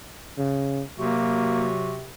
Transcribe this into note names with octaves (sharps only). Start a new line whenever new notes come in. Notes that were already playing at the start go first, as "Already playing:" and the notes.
C#3
C3 F#3 A#3 F#4